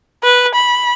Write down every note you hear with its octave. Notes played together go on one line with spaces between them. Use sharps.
B4
B5